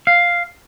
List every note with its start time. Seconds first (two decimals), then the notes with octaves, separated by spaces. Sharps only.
0.07 F5